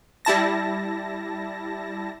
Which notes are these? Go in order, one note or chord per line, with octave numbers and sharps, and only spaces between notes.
G3 E4 A5 A#6